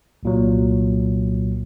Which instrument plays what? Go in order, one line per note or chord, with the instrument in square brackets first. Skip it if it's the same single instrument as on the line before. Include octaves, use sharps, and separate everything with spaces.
[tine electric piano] C2 A#2 F#3